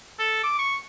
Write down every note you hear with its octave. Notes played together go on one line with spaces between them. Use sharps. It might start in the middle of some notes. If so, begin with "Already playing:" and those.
A4
D6
C#6